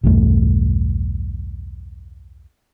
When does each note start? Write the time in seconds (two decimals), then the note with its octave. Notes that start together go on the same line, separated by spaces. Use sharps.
0.04 B1 E2 G2 A3